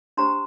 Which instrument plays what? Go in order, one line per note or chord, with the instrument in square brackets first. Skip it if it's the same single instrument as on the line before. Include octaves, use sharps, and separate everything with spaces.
[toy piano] D4 G4 C5 A#5 C6